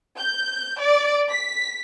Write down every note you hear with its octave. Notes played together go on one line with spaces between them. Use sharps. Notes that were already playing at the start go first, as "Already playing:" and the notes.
G6
D5
B6